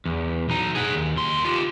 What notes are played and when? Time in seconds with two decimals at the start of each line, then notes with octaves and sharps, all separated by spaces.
0.05 E2
0.49 B1 D#4
0.75 G#4 F#5
0.95 D#2
1.17 D#2 C6
1.45 F4 G4